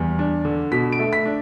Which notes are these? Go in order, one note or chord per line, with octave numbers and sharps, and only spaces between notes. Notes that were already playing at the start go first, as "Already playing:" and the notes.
Already playing: E2 G3
D4
D3
B2 B6
D7
A3
B6
D4